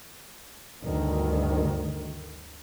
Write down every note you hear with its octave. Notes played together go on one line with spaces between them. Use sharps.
D2 G2 D#3